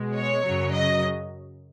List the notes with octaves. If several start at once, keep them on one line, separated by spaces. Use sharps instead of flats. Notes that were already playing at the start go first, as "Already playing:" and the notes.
Already playing: B2 G#3
C#5
F#2 C#3 F#3
D#5